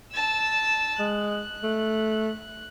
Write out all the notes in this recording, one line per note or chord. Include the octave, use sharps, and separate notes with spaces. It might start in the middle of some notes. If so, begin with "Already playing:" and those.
A5 E6
G#3 F#6
A3